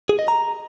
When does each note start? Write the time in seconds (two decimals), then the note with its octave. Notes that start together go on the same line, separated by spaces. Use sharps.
0.09 G#4
0.19 D#5
0.28 A#5